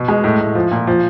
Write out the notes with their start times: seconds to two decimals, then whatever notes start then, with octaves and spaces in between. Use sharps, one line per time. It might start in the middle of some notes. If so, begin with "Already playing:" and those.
Already playing: B2
0.08 G#3
0.24 A2
0.40 A2
0.55 F3
0.72 A#2
0.87 F3